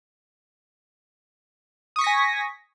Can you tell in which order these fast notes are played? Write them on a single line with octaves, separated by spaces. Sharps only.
D#6 C#6 B6 A#6 G#5